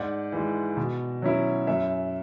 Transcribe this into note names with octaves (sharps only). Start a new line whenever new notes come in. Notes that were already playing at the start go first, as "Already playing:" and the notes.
Already playing: G#2 D5 F#5
E3 G#3
B2
F#3 C#4 E4
F#2 E5 G#5